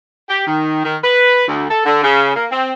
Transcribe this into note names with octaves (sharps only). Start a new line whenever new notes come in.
G4
D#3
D#3
B4
D2
A4
D3
C#3
A#3
C4